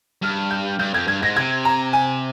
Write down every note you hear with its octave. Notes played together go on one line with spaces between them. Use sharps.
G2 F6
G6
G2 G6
F2 G#6
G2 G#6
G#2 A#6
C3 G#6
A#5
G#5